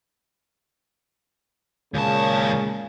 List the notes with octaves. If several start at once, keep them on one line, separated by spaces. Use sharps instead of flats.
D#2 A#2 C#3 G#3 A5